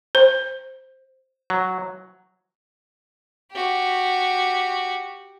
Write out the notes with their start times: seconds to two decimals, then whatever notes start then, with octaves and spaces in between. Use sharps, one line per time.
0.15 C5
1.50 F#3
3.52 F#4 G4